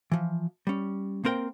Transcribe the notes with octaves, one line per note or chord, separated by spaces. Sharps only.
E3 F3
G3 C#4
A#3 C4 A#4 G5